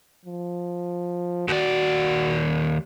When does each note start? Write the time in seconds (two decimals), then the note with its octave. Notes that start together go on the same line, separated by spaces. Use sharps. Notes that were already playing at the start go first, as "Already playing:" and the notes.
0.25 F3
1.48 D#2 F#4 D5